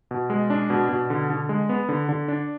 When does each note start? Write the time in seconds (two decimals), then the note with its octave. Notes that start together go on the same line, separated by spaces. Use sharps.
0.11 B2
0.30 G#3
0.50 D4
0.70 B2
0.89 B2
1.10 D3
1.30 D3
1.49 G#3
1.69 B3
1.89 D3
2.09 D3
2.28 D4